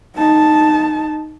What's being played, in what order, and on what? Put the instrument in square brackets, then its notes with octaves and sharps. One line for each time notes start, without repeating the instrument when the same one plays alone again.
[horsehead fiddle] D#4 A5